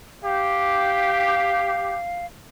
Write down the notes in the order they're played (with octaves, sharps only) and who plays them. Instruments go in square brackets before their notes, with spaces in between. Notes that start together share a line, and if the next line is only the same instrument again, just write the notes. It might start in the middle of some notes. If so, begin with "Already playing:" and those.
[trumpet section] G4 [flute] F5